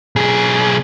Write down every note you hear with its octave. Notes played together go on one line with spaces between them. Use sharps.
B1 G#4